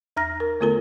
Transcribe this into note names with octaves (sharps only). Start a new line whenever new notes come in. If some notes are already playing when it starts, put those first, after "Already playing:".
E2 A#5 F6 A#6
A#4
D3 A3 B3 F4 A4 A#4